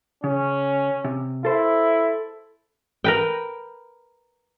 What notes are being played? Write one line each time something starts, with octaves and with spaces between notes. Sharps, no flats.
C#3 C#4
C3
E4 A4 C5
A#4 B4 G5